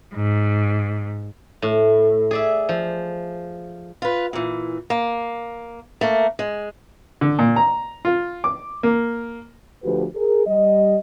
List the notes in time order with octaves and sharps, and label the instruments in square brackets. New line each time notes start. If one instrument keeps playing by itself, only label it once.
[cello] G#2
[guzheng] A2
G#4 D5 E5
F3
[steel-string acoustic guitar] F4 B4
A#2 E3
A#3
A3 A#3 A#4
G#3
[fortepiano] D3
A#2
A#5
F4
D6
A#3
[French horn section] D2 F3 F#4 G4 B4
G#4 A#4
G3 D#5